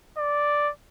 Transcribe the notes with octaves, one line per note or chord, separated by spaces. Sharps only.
D5